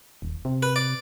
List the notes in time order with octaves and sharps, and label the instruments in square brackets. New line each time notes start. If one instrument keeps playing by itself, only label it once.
[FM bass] D#1
C3
[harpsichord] B4
D5